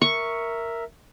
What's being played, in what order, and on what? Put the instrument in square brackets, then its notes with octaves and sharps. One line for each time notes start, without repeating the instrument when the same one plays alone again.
[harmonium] A#4 E5 [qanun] C#6